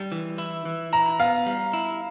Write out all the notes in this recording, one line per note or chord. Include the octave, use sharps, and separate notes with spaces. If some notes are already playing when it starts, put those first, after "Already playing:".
Already playing: G3
E3
E4
E3
E4 A#5
B3 F5
G3
E4